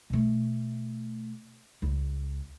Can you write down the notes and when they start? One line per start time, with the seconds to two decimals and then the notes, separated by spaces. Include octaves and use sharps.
0.10 B2 A3
1.82 C#2